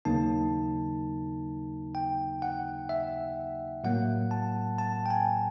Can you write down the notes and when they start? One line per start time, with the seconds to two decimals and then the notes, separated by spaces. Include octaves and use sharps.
0.05 D#2 C#3 F#3 A#3 D#4 A5
1.95 G5
2.42 F#5
2.89 E5
3.84 A2 F#3 A#3 F#5
4.31 A5
4.78 A5
5.06 G5
5.10 G#5